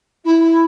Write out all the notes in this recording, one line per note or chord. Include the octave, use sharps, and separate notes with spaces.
E4